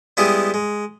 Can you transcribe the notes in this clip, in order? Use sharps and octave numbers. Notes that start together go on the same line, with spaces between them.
G3 G#3 B3 E4 G4 G#4
G#3